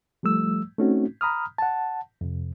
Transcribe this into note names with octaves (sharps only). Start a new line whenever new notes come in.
F3 G3 A3 E6
A3 C4 C#4 D#4 F#4
A#5 B5 D#6 F6
F#5 A5
F2 C3